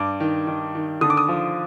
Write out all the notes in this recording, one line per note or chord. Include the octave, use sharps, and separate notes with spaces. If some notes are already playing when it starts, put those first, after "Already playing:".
Already playing: G2 D6
D#3
D#3
D#3
D3 D#6
D6
D#6
F3